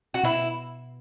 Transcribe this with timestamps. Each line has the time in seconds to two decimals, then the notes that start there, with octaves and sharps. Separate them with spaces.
0.14 F#4
0.24 B2 E4